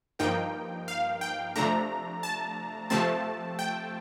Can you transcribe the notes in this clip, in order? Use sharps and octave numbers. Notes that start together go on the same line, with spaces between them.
G2 F3 A#3 D#4 G5
F5
G5
C3 F3 A3 D4 A#5
A5
C3 F3 A3 C4 A5
G5